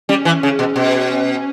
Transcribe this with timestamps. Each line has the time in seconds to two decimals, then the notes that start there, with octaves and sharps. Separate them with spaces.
0.09 G3 C#4
0.25 E3
0.43 C#3
0.59 B2
0.76 B2